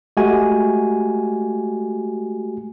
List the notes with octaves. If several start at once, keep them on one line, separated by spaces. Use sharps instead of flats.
G#3 A3 F#4 G4 G#5